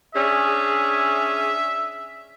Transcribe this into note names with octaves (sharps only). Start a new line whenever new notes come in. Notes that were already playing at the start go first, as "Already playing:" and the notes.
C#4 D4 G#4 E5